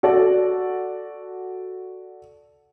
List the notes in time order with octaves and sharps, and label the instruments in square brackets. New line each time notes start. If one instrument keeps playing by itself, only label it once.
[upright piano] F#4 A4 D5